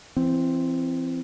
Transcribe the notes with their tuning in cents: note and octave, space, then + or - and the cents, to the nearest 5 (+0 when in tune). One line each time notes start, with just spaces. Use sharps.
E3 +30 C4 +0